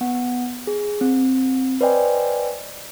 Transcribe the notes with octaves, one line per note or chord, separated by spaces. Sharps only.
B3 F#5
G#4
C4
B4 C5 D5 D#5 G5 G#5